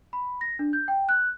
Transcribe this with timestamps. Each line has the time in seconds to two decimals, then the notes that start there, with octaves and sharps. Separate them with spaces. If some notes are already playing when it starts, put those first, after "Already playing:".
0.13 B5
0.41 A#6
0.59 D4
0.73 G6
0.88 G5
1.09 F#6